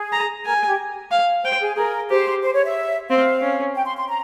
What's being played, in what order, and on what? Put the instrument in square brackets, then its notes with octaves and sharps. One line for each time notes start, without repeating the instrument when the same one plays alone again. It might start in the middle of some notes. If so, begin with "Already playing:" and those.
Already playing: [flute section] G#4
[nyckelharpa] A#5
[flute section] A#4 [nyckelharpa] G#5
[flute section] G#4
G4
[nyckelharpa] F5
[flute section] C5 [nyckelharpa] G5
[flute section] G#4
[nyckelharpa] G#4 [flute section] A#4
[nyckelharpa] G4 [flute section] C5
[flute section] C5
C#5
E5
[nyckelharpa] C4 [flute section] F5
[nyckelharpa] C#4
[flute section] G5
C6
C6
A#5